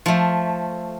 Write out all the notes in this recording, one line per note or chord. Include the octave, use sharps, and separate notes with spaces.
F3 A3